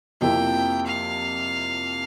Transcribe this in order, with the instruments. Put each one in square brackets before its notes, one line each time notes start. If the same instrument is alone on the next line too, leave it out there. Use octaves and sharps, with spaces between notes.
[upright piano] F2 C3 F3 A#3 E4 [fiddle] G5
[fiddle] F5